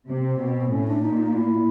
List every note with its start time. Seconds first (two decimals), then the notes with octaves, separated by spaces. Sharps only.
0.08 C3 C4
0.40 B2
0.71 A2 C#4
0.87 D4
1.02 A#2 D#4
1.17 D#4
1.34 E4